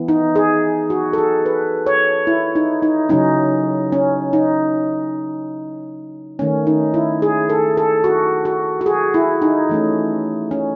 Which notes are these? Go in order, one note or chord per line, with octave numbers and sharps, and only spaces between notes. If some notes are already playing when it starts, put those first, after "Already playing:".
Already playing: E3 B3
D#4
G#4
F#4
A4
G#4
B4
C#5
E4
D#4
D#4
C#3 F#3 C#4 D#4
C#4
D#4
D#3 A3 C#4
D#4
E4
G#4
A4
A4
F#4
F#4
F#4
G#4
E4
D#4
E3 A3 C#4
C#4